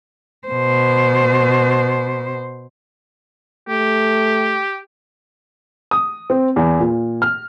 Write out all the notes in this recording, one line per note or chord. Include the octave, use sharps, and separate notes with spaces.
B2 C5
A3 G4
D#6
C4
E2
A#2
F6